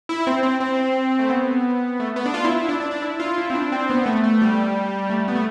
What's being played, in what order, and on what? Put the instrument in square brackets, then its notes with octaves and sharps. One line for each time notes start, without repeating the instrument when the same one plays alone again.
[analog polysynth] E4
C4
C4
C4
A3
B3
A3
B3
D4
F4
E4
E4
D4
D4
D4
E4
F4
E4
C4
D4
C4
B3
A3
A3
G3
A3
G3
B3
A3